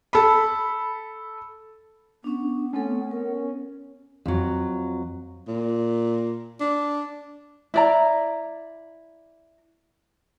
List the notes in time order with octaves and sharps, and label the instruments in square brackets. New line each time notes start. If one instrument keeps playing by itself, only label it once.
[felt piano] A4 B5
[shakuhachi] B3 [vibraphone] C#4 D4
[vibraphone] A3 C4 A4 [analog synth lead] C#4
[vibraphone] A#4
[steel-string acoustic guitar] F2 F#3
[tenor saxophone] A#2
D4
[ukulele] E4 D5 A#5